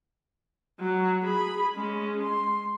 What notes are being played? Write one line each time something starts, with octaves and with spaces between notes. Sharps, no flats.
F#3
G#4 B5
G#3 C#4
C6